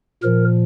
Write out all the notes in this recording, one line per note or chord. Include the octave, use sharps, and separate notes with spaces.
A#2 F3 A#4